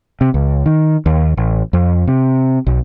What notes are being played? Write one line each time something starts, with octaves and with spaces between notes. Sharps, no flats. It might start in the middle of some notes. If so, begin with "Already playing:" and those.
C3
C#2
D#3
D#2
A1
F2
C3
B1